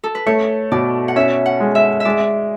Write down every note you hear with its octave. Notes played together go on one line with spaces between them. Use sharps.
A4
B4
A3 C#5
B2 D5
F#5
C#4 E5
F#5
G#3
E5
E5
G#3 D5